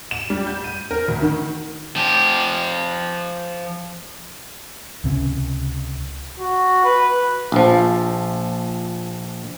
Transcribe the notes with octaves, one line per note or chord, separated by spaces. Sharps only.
E7
G3
G6
D#7
A#4
D2
D#3
F3 G4
C#2 C3 C#4
F#4
B4
A#1 F3